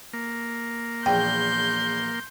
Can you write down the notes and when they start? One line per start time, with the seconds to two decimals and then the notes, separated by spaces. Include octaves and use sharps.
0.13 A#3
1.06 A#1 E2 G5 C6 G6